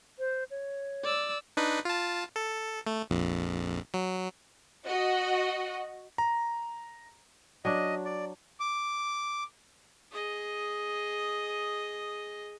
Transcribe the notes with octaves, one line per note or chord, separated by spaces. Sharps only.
C5
C#5
D5 E6
D4 D#4 B4
F4 A5
A4
A3
A#1 F2
F#3
F#4 D#5
A#5
F#3 D4 D#5
D5
D6
G#4 D#5